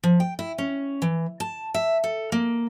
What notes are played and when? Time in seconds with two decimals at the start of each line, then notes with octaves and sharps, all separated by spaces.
0.03 F3
0.20 G5
0.39 E4
0.58 C#4
1.02 E3
1.40 A5
1.74 E5
2.04 A4
2.32 A#3